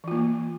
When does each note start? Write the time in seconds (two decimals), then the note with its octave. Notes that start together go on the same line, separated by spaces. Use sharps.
0.04 E3
0.08 F4
0.11 A#3